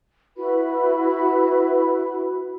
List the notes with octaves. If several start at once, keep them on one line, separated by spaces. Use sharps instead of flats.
E4 F#4 B4 B5